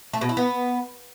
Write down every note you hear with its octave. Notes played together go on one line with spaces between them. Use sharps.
A3
B2
E4
B3